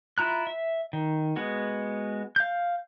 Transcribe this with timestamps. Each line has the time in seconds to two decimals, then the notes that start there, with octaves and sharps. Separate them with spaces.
0.18 E4 F4 A#5 F#6
0.47 E5
0.93 D#3
1.36 G#3 B3 F#4
2.36 F5 G6